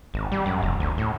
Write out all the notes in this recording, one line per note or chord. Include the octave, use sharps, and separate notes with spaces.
G#1
G3
F#2
F1
D2
A2